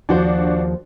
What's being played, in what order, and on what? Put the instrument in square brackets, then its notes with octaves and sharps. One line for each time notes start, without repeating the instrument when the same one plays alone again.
[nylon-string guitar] D#2 F3 C5 [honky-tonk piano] D4 F#4